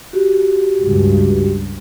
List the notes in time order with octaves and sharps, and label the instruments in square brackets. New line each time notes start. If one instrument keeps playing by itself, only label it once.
[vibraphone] F#4 G4
[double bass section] C#2 G2